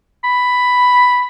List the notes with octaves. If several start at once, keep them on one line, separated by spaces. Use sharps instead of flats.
B5